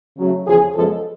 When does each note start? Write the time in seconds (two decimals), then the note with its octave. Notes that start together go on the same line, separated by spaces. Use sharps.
0.18 C#3 F#3 A3
0.46 E2 C#3 F3 G#4
0.75 F#2 C#3 F3 G#3 B3 A4